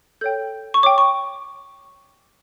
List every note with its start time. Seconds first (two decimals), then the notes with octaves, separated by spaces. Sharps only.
0.21 A4 C#5 G5 G6
0.74 C#6
0.83 C#5 G5 D6
0.98 C#6